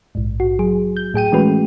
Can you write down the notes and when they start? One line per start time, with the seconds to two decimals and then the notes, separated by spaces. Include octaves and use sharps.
0.15 A#1 G#2
0.40 F#4
0.59 F#3 G#4
0.97 G6
1.14 A2 G#4 G5 D#7
1.32 E3 G#3 A3 C#4 F#4 B4